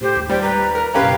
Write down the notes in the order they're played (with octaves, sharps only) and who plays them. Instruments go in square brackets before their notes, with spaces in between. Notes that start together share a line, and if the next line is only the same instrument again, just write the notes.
[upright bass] A2 [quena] G4 [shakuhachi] C5
[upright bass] D#2
[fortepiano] G3 [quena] C5 [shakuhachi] G5
[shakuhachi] B4 [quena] A#5
[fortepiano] A#4
[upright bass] F#1 B2 [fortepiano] C#4 G4 B4 [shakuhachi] F5